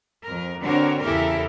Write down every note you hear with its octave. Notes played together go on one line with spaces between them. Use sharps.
F2 A#4
D3 C4 D4 F#4 A#4 C#5
E2 C#3 E4 G4 A4 A#4